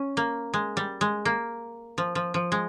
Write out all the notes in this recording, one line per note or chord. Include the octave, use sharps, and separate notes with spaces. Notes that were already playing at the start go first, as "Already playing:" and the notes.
Already playing: C#4
A#3
G#3
G3
G#3
A#3
F3
F3
F3
G#3